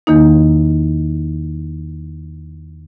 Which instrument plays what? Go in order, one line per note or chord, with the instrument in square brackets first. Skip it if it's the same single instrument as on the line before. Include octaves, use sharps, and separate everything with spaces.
[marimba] E2 D#3 A#3 D#4